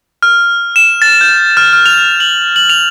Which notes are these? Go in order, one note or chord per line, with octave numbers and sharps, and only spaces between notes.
F6
E7
A6
G6
F6
F6
F7
F#7
F#7
F7